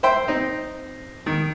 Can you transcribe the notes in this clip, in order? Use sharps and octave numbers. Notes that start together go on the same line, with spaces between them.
C5 E5 G5 C6
C4 D#4
D#3